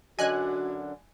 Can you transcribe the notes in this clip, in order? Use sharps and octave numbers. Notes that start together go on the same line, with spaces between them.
F#2 D3 F#4 D#5 G#5 F#6